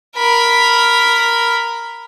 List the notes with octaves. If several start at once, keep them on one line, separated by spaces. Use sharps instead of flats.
A#4 B5